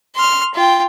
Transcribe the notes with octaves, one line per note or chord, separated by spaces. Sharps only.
C6 F6
F4 G5